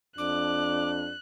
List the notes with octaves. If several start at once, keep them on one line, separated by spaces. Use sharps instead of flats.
F2 D4 D6 F#6